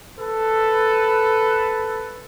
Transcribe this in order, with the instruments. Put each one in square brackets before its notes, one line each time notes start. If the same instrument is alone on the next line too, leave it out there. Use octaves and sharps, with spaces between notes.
[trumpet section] A4 B4